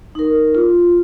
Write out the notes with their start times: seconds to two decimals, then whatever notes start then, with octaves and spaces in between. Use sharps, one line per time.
0.15 D#4 A#4
0.55 F4